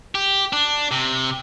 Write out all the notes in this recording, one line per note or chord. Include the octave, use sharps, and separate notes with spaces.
G4
D4
C3